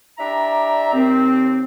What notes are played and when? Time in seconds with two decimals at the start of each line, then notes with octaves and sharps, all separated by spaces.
0.18 D4 E4 G4 D5 E5 A#5
0.93 D#2 C4